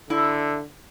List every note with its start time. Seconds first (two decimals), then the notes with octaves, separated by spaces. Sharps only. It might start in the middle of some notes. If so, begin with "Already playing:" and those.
0.10 D3 E4 E5